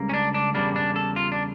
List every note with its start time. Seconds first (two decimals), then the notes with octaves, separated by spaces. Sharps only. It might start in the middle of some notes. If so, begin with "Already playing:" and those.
Already playing: C#2 C#3 G3 A#3
0.09 C#4
0.14 D4
0.34 D4
0.54 E2 C#3 G3 A#3 D4
0.76 D4
0.96 A4
1.16 F4
1.32 D4